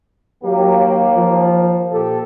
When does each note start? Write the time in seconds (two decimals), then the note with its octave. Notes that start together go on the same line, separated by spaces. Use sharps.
0.44 D#2 F#3 A#3 G4
1.15 F3
1.92 A#2 G4 A4